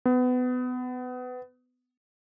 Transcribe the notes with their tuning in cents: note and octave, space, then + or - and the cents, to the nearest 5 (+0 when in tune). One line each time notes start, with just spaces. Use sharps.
B3 +25